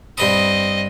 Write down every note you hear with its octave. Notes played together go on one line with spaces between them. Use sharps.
G2 C4 D#5 B5 D#6